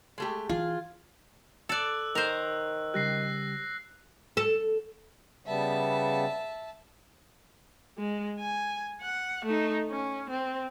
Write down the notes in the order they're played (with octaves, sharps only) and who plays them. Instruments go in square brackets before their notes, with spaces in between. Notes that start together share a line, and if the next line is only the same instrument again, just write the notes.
[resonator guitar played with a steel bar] G#3 A3 G4
[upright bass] E3 [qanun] F4 [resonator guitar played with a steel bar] G#4
[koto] A4 D5 [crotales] E6 F#6
[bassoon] D#3 [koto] A#4 C5
[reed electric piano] C#3 G3 G4 [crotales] F#6 A#6 C7
[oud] A4
[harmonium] C#3 G3 B3 [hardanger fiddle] E5 A5
[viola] G#3
G#5
F#5
A3 D#4
C#4
C4